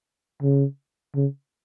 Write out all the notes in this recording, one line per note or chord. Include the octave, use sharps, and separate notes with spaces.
C#3
C#3